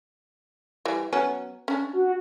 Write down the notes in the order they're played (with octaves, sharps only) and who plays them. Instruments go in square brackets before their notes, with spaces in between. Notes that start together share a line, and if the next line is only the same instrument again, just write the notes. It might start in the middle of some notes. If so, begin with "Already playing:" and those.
[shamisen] E3 G3
F#3 B3 C#4
C#4 D4
[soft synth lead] F#4